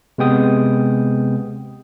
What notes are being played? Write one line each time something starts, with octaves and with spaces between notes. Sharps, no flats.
C3 G#3 B3 G5 D#6